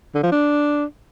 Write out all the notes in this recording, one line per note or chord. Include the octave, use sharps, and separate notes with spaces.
D3
F3
D4